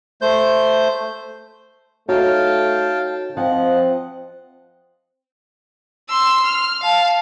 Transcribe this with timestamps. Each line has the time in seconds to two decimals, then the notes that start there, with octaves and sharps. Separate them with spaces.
0.21 A3 C5 G6
2.09 A3 D#4 F#4 C#5 F5 G5 A5
3.37 F3 C4 D#5 F#5
6.10 C6 E6
6.45 F6
6.81 F5 A5